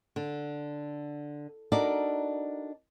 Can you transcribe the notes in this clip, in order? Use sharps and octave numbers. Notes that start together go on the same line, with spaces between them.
D3
D4 D#4 F#4 A4 A#4 D5